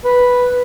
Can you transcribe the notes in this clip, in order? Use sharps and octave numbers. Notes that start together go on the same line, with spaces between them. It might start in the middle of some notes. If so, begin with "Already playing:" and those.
B4